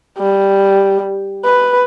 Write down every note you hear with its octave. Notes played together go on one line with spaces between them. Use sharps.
G3
B4